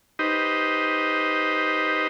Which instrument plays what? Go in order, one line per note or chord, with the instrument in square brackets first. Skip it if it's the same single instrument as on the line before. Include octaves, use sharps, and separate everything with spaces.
[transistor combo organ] D#4 G4 B4 C5 D#5